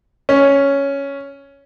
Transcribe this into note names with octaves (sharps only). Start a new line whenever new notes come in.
C#4